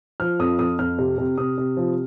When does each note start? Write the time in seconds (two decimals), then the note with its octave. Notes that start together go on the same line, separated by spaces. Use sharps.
0.20 F3 F6
0.39 F2 D#6
0.59 F2 D#6
0.79 F2 F6
0.98 C3
1.18 C3
1.38 C3 D#6
1.58 C3
1.77 F3